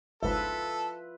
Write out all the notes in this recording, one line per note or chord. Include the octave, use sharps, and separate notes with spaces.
G1 C#2 G#2 F4 A4 B4 E5